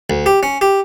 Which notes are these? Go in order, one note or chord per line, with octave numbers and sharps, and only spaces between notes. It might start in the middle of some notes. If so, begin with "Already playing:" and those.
D2
G4
C#4
G4